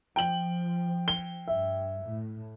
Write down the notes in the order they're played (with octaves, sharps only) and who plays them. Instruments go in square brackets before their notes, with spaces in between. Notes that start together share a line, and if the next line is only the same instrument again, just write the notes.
[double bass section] F3 [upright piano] G5 F#7
[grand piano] G7
[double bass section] G2 [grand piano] E5
[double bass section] A2